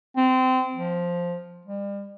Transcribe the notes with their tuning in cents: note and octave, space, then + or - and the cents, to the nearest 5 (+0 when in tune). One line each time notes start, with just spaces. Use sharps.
C4 -25
F3 +5
G3 +40